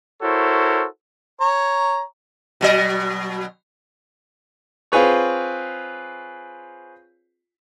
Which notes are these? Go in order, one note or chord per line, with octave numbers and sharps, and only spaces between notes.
E4 F#4 A4 A#4 C5 C#5
C#5 A#5
B2 F#3 D#5
C4 F4 G#4 B4 C#5